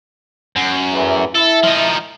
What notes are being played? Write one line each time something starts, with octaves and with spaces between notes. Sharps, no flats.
F#2
E2 A2 E3
E4 A4
F3 D#4